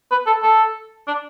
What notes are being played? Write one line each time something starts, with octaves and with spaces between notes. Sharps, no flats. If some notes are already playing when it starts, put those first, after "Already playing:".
B4
A4
A4
D4